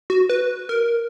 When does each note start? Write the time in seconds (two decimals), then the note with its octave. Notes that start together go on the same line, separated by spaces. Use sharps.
0.10 F#4
0.30 B4
0.69 A#4